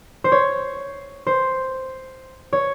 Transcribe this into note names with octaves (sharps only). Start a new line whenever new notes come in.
C5
C#5
C5
C#5